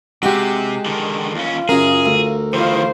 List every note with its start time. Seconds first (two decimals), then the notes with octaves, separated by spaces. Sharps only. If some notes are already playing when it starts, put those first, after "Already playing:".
0.23 C3 G#3 F#4 G4
0.85 D3 D#3
1.34 D#2 C#4 F4
1.69 F#2 C#3 G#4 A#4
2.06 D2
2.54 D#3 E3 F4 C5